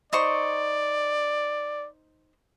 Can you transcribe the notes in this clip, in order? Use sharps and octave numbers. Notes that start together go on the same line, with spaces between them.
D#4 C5 D5 C#6